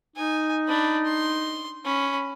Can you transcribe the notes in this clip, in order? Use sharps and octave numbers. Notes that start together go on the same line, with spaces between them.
D#4 G#5
D4 B5
C6
C#4 B5